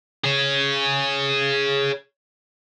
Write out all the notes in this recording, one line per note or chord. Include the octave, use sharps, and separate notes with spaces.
G#4 C#5